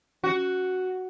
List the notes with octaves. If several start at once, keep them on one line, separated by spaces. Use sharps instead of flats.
F#4